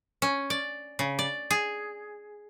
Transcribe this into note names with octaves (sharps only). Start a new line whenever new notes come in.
C#4
D5
C#3
D5
G#4